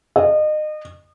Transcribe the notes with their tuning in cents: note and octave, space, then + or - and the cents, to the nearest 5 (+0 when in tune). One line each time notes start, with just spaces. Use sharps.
D#5 -30